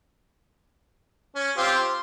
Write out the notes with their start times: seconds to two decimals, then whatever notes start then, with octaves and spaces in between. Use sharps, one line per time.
1.35 C#4
1.57 C4 F4 G4
1.76 C6